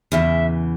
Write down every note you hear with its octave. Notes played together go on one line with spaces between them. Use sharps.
E2 C#3 E3 E5